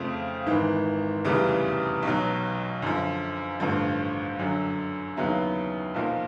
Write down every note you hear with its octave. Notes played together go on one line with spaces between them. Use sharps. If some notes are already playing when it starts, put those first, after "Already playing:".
Already playing: F2 C#3 F3 A3 C4
G#1 G#2 E3
F1 E2 C#3 E3 G3
B1 B2 F#3
F#2 D3 F3
A1 G2 D3 F3
F#2 D3 F#3
D#2 C#3 F#3 B3 E4
B1 A#2 F3 A#3